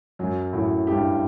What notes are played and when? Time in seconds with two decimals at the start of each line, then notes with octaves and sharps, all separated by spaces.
0.19 F#2 F#3
0.53 A2 F#3
0.87 G2 G4